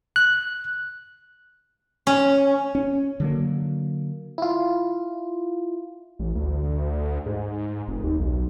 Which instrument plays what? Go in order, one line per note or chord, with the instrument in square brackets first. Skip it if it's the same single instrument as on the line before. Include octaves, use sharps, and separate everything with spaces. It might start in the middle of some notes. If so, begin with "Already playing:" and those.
[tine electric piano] F#6
[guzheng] C#4
[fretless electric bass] C#4
D3 F#3 A#3
[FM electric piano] E4 F4
[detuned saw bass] A1
D2
G#2
F1
D#2
B1